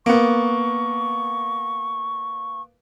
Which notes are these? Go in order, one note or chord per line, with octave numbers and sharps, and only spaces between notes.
A#3 B3 C#6